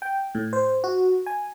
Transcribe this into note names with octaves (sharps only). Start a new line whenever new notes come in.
G5
A2
C5
F#4
G#5